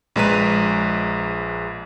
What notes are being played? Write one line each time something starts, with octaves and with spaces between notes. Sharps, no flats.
A#1 G#3 B4 A#5 D#7